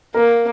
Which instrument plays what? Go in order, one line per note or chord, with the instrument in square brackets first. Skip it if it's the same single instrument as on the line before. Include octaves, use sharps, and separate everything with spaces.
[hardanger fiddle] A#3 [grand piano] A#4